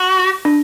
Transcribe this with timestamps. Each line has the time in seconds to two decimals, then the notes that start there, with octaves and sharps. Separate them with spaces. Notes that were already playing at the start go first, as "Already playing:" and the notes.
Already playing: F#4
0.45 D4